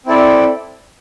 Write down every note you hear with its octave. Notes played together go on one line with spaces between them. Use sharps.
C4 E4 A4 D5